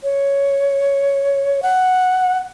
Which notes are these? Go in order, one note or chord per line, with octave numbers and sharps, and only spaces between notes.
C#5
F#5